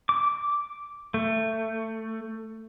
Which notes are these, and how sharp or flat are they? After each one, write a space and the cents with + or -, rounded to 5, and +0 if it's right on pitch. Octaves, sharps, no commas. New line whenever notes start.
D6 -5
A3 +20